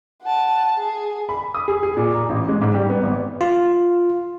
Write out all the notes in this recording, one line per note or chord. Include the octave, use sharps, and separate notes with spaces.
F#5 A5
G#4
B5
D#6
G#4
G#4
A#2
A#5
A1
G#3
G#2
G3
B3
G#1
F4